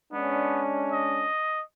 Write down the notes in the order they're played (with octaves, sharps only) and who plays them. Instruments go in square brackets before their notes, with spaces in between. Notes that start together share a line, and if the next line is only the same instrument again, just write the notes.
[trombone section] G#3 C#4 D4 [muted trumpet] B3
[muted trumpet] D#5